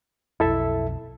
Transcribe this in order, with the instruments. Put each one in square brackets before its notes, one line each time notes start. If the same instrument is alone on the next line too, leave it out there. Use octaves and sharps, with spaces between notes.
[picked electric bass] B1 F2 [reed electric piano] E4 A4 E5